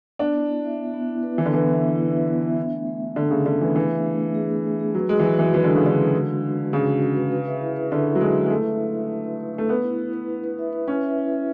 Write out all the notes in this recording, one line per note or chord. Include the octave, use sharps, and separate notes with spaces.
B3 D4
E4
E4
E5
B3
B3
E4
B4
E3 B4
D3
E3 B3
E5
E4
E4
E4
B3
E5
D4
A3
A3
D4
D3 A3
C#3 G#4
D3 D4
E3 A3
E3 D4
D4
A3
A3
G#4
A3
A3
G#4
F#3 B4
G#3 F#4
E3
F#3 G#3
E3 B4
E3 D4
D3 G#3
C#3
D3 B4
B4
F#4
G#3
D4
D4
C#3 F#4
F#4
F#4
B4
B4
E5
E4
B4
D3 E5
E4
F#3
G#3 E4
E4
G#3
A3 B4
B4
E4
E5
E4
B4
B4
A3 B4
B3 B4
E4
E4
B4
E4
B4
E5
B4
C#4 B4
E5
E4
B4